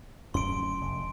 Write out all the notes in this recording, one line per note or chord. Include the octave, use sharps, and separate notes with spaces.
D1 F#2 C#4 C6 D7
F1